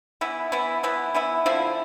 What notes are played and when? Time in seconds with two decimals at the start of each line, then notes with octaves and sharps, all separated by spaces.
0.21 E3 B3 E4
0.52 E3 B3 E4
0.83 E3 B3 E4
1.15 E3 B3 E4
1.46 D3 F3 C4 E4